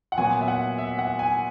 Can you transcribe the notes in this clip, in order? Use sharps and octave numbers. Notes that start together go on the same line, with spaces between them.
F#5
A#2 F#3 B3 G#5
E5
F#5
E5
F#5
G#5